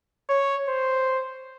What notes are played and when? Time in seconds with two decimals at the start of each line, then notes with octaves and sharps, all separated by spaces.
0.29 C#5
0.68 C5